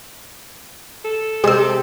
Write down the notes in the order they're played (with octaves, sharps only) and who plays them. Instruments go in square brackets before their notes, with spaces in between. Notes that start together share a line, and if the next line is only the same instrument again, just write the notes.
[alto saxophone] A4
[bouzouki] C3 C4 [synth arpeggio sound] G#3 E6